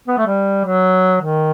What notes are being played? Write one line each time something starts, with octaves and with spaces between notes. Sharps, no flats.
B3
A3
G3
F#3
D#3